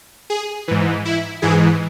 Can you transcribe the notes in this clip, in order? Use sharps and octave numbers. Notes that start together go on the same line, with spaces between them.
G#4
G#2 E3
E4
G#2 E3 G#4